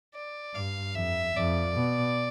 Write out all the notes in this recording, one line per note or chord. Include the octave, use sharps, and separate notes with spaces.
D5
G2 F5
F2 E5
F2 D5
B2